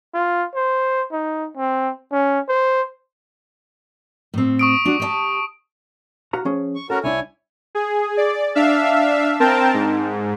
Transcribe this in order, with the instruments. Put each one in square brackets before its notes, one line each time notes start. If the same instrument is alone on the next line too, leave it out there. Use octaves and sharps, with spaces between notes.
[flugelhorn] F4
C5
D#4
C4
C#4
C5
[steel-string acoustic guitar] A2 C4
[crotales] C#6 D#6 D7
[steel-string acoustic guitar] D4 F#4
G4 D5 A5
[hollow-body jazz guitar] F#4 F5 A#5
F3 C#4 G#4
[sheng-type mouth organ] C#6
[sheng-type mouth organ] C#4 F#4 A#4 [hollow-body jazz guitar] A4
[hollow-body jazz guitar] C2 D4 [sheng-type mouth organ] E4 C#5 G#5
[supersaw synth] G#4
D5
D4 E5 F5
C4 A#4 G5 A5
G#2